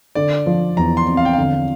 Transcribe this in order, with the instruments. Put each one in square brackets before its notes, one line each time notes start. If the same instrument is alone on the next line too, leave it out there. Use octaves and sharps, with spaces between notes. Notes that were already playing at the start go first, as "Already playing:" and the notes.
[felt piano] D3 [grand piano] D5
[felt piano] F3
[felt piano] E2 [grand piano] A#5
[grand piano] C6
[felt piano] C4
[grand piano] F5
G5
[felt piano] D3 [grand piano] F5